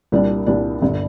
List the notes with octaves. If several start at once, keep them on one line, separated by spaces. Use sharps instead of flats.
C2 A#2 G3 D4
C2 A#2 G3 D4
G1 G2 D3